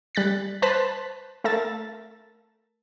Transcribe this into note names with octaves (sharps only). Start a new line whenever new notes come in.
G3 F#6 A6 B6
B4 C5 A5 F#6 A6 B6
A3 A#4 E5 A5 A6